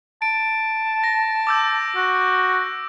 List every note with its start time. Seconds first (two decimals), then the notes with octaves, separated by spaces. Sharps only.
0.22 A5 D7
1.04 A#6
1.47 D6 E6 G6
1.96 F#4